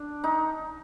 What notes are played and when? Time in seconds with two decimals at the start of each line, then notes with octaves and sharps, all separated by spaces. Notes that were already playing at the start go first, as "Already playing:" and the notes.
Already playing: D4
0.24 D#4